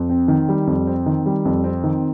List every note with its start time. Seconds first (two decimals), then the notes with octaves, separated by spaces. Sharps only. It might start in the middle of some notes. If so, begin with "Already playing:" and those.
Already playing: F2
0.09 C4
0.28 D#3
0.49 G3
0.67 F2
0.87 C4
1.06 D#3
1.26 G3
1.45 F2
1.64 C4
1.84 D#3